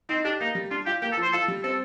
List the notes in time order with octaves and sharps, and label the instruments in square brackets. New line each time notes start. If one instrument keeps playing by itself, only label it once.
[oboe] C4 [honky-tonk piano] D#4
[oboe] D4 [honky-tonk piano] G4
[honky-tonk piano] A#3 [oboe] D#4
[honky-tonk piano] G3
[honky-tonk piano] D4 [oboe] F4
[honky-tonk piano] F4 [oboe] G4
[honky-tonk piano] A#3 [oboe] G4
[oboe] A4
[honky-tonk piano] F3 [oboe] C5
[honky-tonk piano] F4 [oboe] A4
[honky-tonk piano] G3
[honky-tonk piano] C4 [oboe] A4